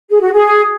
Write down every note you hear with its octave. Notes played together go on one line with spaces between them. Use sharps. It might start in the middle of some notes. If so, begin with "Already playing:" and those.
G#4
F#4
G#4